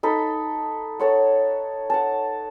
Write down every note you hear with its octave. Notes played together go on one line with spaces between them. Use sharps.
D#4 A4 B5
A4 C#5 F#5
F#5 A5